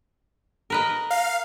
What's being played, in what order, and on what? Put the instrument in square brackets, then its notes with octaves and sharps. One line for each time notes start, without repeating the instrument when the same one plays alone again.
[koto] A#4 B4 D#5
[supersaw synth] F5